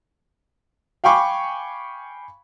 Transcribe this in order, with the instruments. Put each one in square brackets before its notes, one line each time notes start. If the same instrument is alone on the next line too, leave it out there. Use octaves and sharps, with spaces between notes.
[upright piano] F5 G5 G#5 B5 C#6 D6